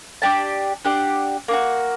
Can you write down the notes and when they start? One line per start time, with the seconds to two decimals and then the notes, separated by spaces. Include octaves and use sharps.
0.22 D4 G4 D5 A5
0.85 D4 G4 D5 F#5
1.48 A#3 D4
1.53 F#4